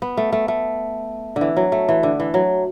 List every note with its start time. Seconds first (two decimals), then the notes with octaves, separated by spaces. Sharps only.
0.02 B3
0.17 A3
0.32 A3
0.48 A3
1.36 D3
1.41 E3
1.56 F#3
1.72 A3
1.89 E3
2.03 D3
2.20 E3
2.34 F#3